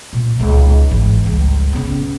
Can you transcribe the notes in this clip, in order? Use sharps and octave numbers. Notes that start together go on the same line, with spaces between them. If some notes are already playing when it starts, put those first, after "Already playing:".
A#2
C#2 D#4
G#1 E3
C#2 G2
C#3 B3